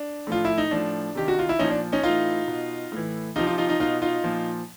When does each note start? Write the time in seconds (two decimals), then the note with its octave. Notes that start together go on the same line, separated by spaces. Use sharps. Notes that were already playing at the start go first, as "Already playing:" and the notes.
Already playing: D4
0.27 A2 F3 F4
0.45 E4
0.58 D#4
0.71 A2 F3 D4
1.15 C3 D#3 G4
1.28 F#4
1.39 F4
1.49 E4
1.59 A#2 F3 C#4 D#4
1.70 D4
1.92 C#4 D#4
2.03 A2 E3 D#4 F4
2.48 B2
2.92 A2 E3
3.36 C3 F3 D#4 F4
3.47 D#4 F4
3.58 D#4 F4
3.69 D#4 F4
3.80 B2 D#4 F4
4.02 D#4 F4
4.24 A#2 F3